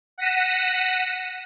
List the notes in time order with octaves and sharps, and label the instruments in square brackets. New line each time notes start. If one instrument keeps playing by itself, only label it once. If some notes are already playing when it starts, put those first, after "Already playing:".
[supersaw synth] F#5 A#6 B6 D#7 E7